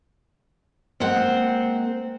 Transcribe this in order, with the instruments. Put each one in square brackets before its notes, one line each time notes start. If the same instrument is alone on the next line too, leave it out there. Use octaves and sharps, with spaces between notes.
[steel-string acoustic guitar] G#3 A#3 C4 F#5